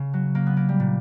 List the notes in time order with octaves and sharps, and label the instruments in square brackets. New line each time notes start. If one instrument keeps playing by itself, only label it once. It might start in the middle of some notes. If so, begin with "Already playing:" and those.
Already playing: [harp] C#3
F#3
A#3
B3
A#3
G3
A#2